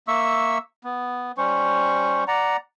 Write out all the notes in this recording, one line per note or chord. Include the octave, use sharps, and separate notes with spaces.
A#3 E5 C#6 E6
B3
G3 C#4 C5 C#6
D5 F#5 A#5